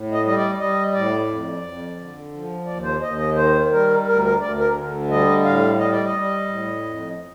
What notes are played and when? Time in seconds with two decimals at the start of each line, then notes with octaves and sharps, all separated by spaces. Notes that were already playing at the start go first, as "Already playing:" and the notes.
Already playing: A2
0.12 D#5
0.24 G3 D#5
0.35 D5
0.58 G3 D#5
0.92 A2 D5
1.27 F2
1.62 F2
1.96 D3
2.32 F3
2.66 D#2 D5
2.83 C5
3.01 D#2 D#5
3.18 D#5
3.35 D#3 C5
3.71 G3 A#4
4.05 D2 A#4
4.22 A#4
4.40 D2 D5
4.58 A#4
4.75 D3
5.09 G3 D#5
5.44 A2 F5
5.78 G3 D#5
5.92 D5
6.04 D#5
6.13 G3
6.48 A2
6.83 F2